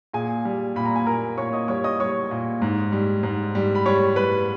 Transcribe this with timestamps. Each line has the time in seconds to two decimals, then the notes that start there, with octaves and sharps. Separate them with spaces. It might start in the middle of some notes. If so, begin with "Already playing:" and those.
0.14 A#2 G#4 G#5
0.45 G3
0.76 A#2 B5
0.85 A#5
0.96 G#5
1.06 A#2 A#4 A#5
1.37 A#2 C#5 C#6
1.53 D#5 D#6
1.68 G3 C#5 C#6
1.84 D#5 D#6
2.00 G3 C#5 C#6
2.31 A#2
2.62 G#2
2.92 G3
3.23 G#2
3.55 G3
3.75 B5
3.86 G3 C#5 C#6
4.16 G3 B4 B5